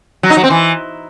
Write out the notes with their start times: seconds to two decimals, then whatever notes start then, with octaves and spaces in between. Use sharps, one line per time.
0.23 F#3
0.30 D#4
0.37 F#3
0.44 C4
0.50 E3